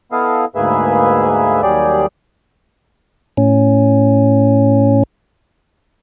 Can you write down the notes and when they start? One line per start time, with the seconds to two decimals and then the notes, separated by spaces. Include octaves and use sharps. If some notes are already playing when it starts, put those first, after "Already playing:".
0.12 B3 E4 A4 D#5 F5
0.55 D2 G#2 A#3 G#4 B4 E5
1.62 D#2 F#3 G3 G4 G#4 D5
3.37 A2 C#4